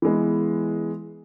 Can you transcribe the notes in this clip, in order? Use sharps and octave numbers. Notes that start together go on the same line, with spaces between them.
E3 G#3 B3